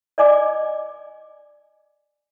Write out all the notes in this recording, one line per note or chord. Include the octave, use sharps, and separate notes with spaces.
D5 D#5 G#5 D6